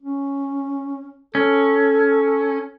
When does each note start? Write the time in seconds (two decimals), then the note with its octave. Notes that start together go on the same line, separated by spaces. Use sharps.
0.02 C#4
1.35 C#4 A4